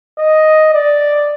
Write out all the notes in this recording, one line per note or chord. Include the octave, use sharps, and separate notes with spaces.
D#5
D5